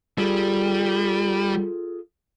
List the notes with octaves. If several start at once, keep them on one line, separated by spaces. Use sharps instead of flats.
G3 F4 G#4 A4